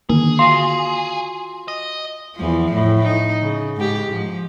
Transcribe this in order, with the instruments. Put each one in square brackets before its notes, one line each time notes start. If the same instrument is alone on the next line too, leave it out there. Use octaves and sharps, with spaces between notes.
[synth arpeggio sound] D3 D#3 A#3 [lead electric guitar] G#4
[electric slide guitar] F4 F#4 F5 [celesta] C6
[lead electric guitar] D#5
[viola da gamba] E2 F3
A2
D#4
C#3
G#2 G4
F3